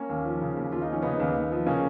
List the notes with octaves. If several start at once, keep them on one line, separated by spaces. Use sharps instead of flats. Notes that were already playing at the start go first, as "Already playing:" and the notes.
Already playing: A#3 C#4
D#2
F3
C#3
D#2
D#2 F4
D#4
F3 C#4
C#3 B3 D#4
D#2
D#2
F3
C#3 A#3 C#4